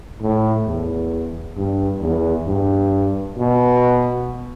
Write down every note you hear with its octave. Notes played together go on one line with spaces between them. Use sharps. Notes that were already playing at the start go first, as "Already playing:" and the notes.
A2
E2
G2
E2
G2
B2